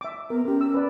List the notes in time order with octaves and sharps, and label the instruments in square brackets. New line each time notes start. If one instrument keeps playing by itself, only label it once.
[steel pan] E5 D6
[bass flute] B3 [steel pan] A#4
[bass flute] C#4 [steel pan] G4 A#4
[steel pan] E6
B4 D5